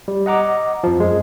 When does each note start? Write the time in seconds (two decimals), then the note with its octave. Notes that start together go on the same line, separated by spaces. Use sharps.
0.08 G3
0.26 D#5 F#5 A#5 D6
0.84 F2 F3
1.00 F#2 G#3